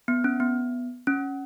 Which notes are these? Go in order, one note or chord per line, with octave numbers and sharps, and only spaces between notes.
B3
C#4
B3
C#4